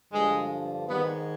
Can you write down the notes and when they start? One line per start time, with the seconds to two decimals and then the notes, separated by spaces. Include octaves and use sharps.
0.13 G2 D3 F3 G#3
0.89 G#2 D#3 G3 B3